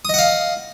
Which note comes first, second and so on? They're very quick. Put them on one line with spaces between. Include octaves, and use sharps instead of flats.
D#6 D#5 F#5 F5